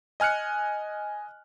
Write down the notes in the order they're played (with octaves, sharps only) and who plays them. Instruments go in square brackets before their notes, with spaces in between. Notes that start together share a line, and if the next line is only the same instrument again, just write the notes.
[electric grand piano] D#5 G#5 F6 F#6 C#7